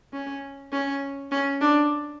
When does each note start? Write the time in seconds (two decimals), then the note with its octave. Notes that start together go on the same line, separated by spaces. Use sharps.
0.13 C#4
0.73 C#4
1.32 C#4
1.61 D4